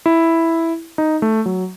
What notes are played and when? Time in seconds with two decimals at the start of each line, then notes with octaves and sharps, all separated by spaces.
0.06 E4
0.98 D#4
1.22 A3
1.46 F#3